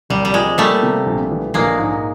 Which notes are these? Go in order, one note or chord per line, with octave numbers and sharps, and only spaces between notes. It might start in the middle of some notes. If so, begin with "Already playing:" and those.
C2 G3
G3
F3 G#3
G3 A3 A#3
C3
A#1
E3
A#1 G#3 A#3
G#2